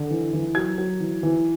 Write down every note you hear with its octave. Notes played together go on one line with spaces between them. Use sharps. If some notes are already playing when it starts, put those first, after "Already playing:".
Already playing: D3
E3
E3
F#3 G#6
F#3
E3
E3